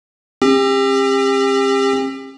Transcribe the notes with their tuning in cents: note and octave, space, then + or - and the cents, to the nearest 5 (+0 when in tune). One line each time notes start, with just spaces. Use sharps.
C4 +45 G4 +35